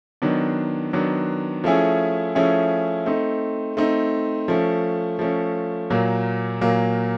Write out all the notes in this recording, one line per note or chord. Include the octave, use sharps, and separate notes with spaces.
D#3 F#3 B3 D4
D#3 F#3 B3 D4
F3 A3 C#4 E4 G#4
F3 A3 C#4 E4 G#4
A3 C4 D#4
A3 C4 D#4
F3 A3 C#4
F3 A3 C#4
A#2 F#3 A#3
A#2 F#3 A#3